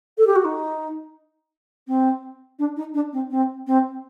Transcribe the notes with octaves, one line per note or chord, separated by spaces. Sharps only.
A4
G4
F#4
D#4
C4
D4
D#4
D4
C4
C4
C4